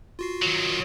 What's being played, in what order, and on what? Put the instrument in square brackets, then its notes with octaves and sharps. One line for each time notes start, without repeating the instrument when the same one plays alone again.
[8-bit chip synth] F4 F#4 C7
[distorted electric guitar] D#3 F#3